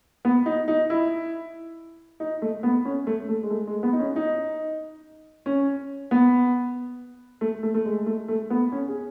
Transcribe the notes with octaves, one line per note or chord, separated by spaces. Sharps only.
B3
D#4
D#4
E4
D#4
A3
B3
C#4
A3
A3
G#3
A3
G#3
B3
D#4
C#4
D#4
C#4
B3
A3
A3
A3
G#3
A3
A3
B3
C#4
G#4